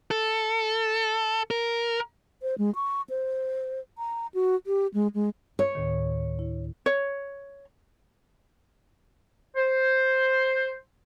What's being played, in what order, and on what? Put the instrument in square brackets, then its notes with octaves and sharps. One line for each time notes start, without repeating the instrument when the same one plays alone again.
[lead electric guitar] A4
A#4
[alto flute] C5
G#3
C#6
C5
A#5
F#4
G4
G#3
G#3
[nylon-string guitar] C#5
[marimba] D2 A2 D#3
E4
[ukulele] C#5
[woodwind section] C5